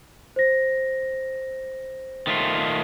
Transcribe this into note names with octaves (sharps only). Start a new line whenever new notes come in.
C5 A#6
D#3 A3 F4